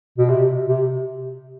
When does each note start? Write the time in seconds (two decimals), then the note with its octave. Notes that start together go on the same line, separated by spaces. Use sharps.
0.18 B2
0.29 C3
0.68 C3